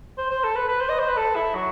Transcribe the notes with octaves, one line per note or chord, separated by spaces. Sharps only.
C5
C5
A4
B4
B4
C5
D#5
C5
B4
A4
E4
F#3